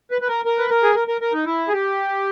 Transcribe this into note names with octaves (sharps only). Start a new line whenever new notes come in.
B4
B4
A#4
A#4
B4
A#4
G#4
A#4
A#4
A#4
D#4
E4
G#4
G4